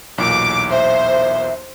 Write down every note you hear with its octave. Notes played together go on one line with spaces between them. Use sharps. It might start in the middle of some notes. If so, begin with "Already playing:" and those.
B1 E2 A#2 D6
C5 E5